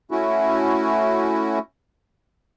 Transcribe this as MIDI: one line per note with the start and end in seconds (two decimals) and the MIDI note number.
0.11 1.59 57
0.11 1.59 61
0.11 1.59 64
0.11 1.59 66